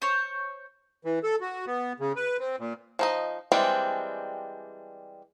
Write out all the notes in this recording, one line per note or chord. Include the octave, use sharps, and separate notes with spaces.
C5 C#5
E3
A4
F#4
B3
C#3
B4
C4
A#2
F3 D#4 D#5
E3 G3 G#3 C4 D4